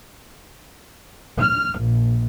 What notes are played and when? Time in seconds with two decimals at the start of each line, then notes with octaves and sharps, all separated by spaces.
1.40 F6
1.80 A#1